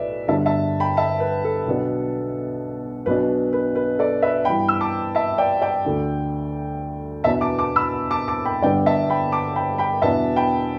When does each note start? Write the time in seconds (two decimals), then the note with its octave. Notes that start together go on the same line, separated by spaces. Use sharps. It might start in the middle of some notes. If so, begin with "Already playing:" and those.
Already playing: B1 A2 A3 B4 D5 E5
0.28 G1 G2 D3 G3 D4 E5 A5
0.46 E5 A5
0.80 G5 B5
0.97 E5 A5
1.20 B4
1.44 A4
1.66 B1 B2 B3 D4
3.06 B1 B2 B3 D4 B4
3.53 B4
3.75 B4
3.99 A4 D5
4.22 B4 E5
4.45 G2 E3 B3 G5 B5
4.69 E6
4.81 A5 D6
5.15 E5 A5
5.38 D5 G5
5.61 D5 G5
5.85 D2 D3 A3
7.23 E2 B2 B3 D4 E5 A5
7.41 A5 D6
7.59 A5 D6
7.76 B5 E6
8.11 A5 D6
8.28 A5 D6
8.45 G5 B5
8.62 G1 G2 D3 B3 D5 G5
8.86 E5 A5
9.10 G5 B5
9.32 A5 D6
9.56 G5 B5
9.78 G5 B5
10.02 E2 B2 B3 D4 E5 A5
10.36 G5 B5